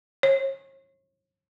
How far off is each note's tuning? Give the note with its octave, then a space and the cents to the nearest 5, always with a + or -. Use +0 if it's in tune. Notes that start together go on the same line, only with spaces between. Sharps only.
C#5 -40